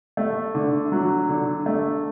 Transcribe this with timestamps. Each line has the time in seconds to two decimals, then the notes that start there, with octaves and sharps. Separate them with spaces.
0.17 A3
0.55 D3
0.92 F#3
1.29 D3
1.66 A3